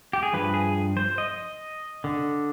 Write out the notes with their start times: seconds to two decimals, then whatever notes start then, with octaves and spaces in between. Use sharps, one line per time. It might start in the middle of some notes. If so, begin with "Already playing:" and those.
0.13 G4
0.23 G#4
0.33 G2 F3 B4
0.54 G#4
0.97 C5
1.18 D#5
2.04 D3